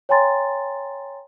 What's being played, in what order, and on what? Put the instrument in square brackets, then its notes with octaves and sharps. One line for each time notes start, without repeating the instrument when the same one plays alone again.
[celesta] C#5 G5 G#5 A#5 C6 A6